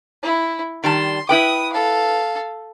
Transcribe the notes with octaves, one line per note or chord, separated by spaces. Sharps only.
E4
D#3 G3 A5 C6
E4 B4 G5 D#6
A4 F5